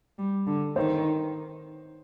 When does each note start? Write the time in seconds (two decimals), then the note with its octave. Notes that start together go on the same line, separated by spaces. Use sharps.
0.19 G3
0.47 D3
0.76 D#3 C5